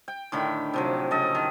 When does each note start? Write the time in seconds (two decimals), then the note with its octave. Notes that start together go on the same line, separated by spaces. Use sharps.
0.08 G5
0.32 A2 D3 D#3 B5
0.74 C3 F3 F#3
1.11 C#3 A4 D#5
1.35 D#3